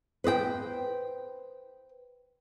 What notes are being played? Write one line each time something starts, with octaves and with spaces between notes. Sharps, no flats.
B4 C5 D#5 G5